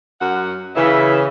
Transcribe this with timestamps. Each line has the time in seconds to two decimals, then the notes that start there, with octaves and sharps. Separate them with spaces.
0.20 F#2 F#5
0.76 C#3 E3 E5